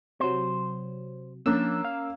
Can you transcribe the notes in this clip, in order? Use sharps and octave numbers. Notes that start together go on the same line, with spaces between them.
C3 F#3 C5
F3 A#3 C#4 D4 E6
F5